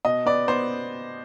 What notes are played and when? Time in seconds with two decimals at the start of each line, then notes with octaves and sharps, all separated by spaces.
0.05 B2 D#5
0.26 B3 D5
0.48 B3 C5